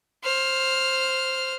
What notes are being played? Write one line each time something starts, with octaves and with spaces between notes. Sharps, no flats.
C5 F6